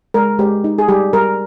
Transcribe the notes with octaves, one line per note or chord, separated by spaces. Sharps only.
G#3 A#4
G#3 G4
D#4
G#4
G3 G4
G3 A#4